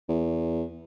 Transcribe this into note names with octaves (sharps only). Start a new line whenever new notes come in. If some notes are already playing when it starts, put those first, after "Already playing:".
E2